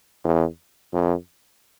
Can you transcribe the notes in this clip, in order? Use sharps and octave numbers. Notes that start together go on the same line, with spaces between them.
E2
F2